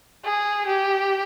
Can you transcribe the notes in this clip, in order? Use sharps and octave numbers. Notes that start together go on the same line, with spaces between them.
G#4
G4